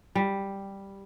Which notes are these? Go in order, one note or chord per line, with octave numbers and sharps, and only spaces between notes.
G3